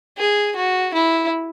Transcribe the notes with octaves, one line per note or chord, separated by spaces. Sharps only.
G#4
F#4
E4